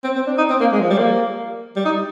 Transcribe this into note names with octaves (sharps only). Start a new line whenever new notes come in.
C4
C4
D4
D#4
C4
A#3
G#3
F3
G3
A#3
G3
D#4